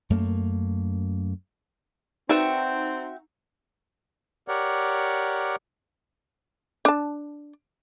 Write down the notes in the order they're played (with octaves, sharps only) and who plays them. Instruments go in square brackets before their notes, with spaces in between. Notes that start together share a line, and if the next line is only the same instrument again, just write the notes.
[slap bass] F#2 A3 A#3
[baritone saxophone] C4 [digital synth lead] D#4 [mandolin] F#4 E5 G5 [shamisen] B4 D5
[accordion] G4 A#4 C#5 D5 F#5
[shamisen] D4 A5